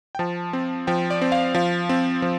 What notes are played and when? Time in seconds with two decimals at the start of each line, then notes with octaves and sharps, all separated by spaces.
0.15 G5
0.19 F3 A5
0.53 C4
0.87 F3 G5
1.10 D5
1.22 C4
1.32 F5
1.55 F3 F5
1.89 C4
2.22 F3